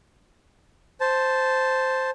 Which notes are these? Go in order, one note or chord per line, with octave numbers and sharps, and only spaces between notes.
C5 A5